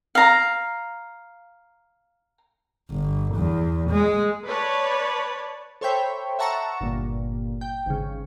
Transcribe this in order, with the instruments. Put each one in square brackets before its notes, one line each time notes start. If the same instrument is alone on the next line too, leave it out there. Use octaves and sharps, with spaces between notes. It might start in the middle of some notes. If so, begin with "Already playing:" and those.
[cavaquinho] F5 A#5
[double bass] G1
E2
G#3
[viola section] B4 C#5 D5 A5
[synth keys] A4 C5 C#5 E5 G5 B5
E5 F#5 A5 A#5 C#6 E7
G1 A#2
G5
G#1 C#3